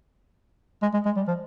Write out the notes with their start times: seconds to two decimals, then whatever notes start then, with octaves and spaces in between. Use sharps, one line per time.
0.82 G#3
0.94 G#3
1.05 G#3
1.16 G3
1.28 F3